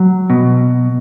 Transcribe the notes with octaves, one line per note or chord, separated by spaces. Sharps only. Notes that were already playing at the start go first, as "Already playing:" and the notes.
Already playing: F#3
B2